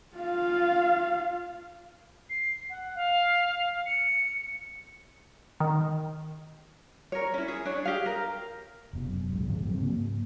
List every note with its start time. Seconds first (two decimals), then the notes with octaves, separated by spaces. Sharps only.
0.16 F4 F5
2.30 C7
2.69 F#5
2.95 F5
3.86 C#7
5.60 D#3
7.12 A#4 C#5
7.34 C#4 E4
7.48 G#4
7.65 D4 C#5
7.85 G4 G#4 F5
8.06 A#4
8.93 F1 B2
9.08 F#2
9.33 D#1 B1 G#3
9.48 G2 D3 F3 G#3
9.65 G2 F3 F#3 C4
9.80 G#2 C#3 A#3